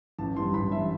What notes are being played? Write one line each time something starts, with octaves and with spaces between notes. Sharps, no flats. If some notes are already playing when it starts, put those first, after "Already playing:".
A1 A5
G2 E3 C6
A1 B5
G2 E3 E5